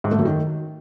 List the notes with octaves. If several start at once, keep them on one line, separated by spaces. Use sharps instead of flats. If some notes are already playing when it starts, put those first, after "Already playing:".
G#2
A3
F#2
D#3